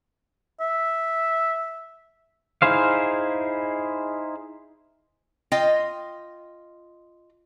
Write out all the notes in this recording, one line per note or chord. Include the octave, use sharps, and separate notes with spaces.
E5
D#4 E4 G#4 C5 F5
F4 D#5 G5